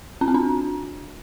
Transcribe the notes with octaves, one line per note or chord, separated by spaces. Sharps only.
C#4
C4
D4